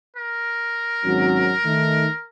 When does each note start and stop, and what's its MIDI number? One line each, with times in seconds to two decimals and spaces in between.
0.17 2.27 70
1.05 1.53 32
1.05 1.53 54
1.05 1.53 61
1.65 2.07 51
1.65 2.07 57
1.65 2.07 63